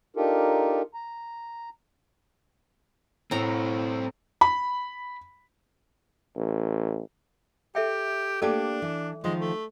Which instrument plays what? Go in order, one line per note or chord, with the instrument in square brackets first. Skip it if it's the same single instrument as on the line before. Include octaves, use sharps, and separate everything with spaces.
[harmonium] D4 D#4 F4 G4 A4 A#4
A#5
[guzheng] A2 A#5 [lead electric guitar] C4 E4
[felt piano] B5
[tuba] A1
[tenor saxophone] G4 [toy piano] A4 E5 G5
[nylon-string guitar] A3 A#3 G4 [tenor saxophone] D4 [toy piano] A4 D5 A5
[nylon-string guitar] E3
[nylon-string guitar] D#3 F3 [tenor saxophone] G#3
[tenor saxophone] A3